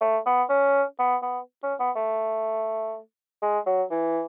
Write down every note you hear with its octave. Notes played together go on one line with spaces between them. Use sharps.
A3
B3
C#4
B3
B3
C#4
B3
A3
G#3
F#3
E3